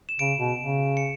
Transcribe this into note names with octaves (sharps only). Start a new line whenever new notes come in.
E7
C#3 D7
B2
C#3
C#7